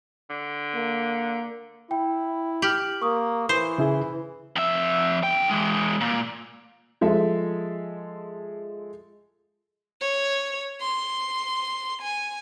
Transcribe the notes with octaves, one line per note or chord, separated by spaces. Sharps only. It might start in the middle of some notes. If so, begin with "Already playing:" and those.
D3
A#3
E4 G5
G4 F6 F#7
A#3 C#6 D#6
E3 C5
C#3 E4 G#4
F2 E5
D3 G5
E3 G#3
A#2
F3 G#3 A4 E5
C#5
C6
G#5